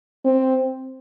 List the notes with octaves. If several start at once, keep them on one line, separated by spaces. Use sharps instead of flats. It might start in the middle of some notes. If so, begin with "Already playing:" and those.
C4